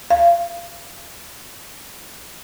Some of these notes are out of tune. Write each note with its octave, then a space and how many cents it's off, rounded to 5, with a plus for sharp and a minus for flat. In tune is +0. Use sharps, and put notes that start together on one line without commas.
F5 -25